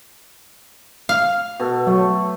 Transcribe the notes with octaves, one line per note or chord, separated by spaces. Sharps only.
F5
B2 A4
F#3 A3